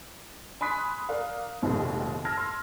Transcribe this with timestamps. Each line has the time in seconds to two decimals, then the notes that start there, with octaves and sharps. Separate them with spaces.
0.61 G#5 B5 C6 D#6 F#6 B6
1.09 A#4 D5 F5
1.62 F1 A#1 D#2 G#2 B2
2.25 A5 E6 F6 G#6 A#6
2.37 C6